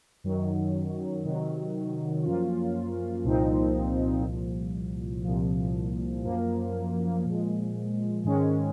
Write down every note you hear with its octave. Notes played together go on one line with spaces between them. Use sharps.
F#2 D#3 F#3
C3 D#3 F#3
F#2 F3 A#3 C#4 F4
C2 A#2 F3 C4 D#4
C2 A#2 F3
C2 A#2 F3
F#2 F3 A#3
A#2 F3 G#3
G#2 D#3 G#3 C#4